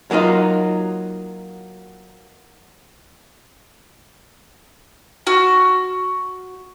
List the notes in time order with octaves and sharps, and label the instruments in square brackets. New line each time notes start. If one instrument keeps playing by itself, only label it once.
[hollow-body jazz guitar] F#3 A#3 D#4 F4
[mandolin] F#4 F6